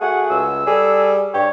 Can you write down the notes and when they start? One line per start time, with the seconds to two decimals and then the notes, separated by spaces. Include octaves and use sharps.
0.01 A3 F#4 G#4 F#5
0.30 C#2 E6
0.67 G3 G#4 A4
1.34 G2 G4 C#5